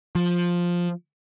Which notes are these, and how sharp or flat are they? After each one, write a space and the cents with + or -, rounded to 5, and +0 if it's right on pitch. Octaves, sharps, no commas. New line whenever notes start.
F3 +5